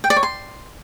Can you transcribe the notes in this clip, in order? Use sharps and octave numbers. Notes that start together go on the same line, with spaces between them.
G5
D5
C#5
C6